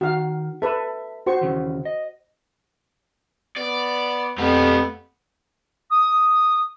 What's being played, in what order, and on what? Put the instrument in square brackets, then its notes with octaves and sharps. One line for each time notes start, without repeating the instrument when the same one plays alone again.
[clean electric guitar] D#3 [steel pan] F#4 F5
[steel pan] A4 B4 [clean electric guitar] E5
[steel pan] F#4 C5 C#6
[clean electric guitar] D#2 C#3 E3
D#5
[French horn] B3 [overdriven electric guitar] D5
[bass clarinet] F2 [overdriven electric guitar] A3 G4 [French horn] B3
[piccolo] D#6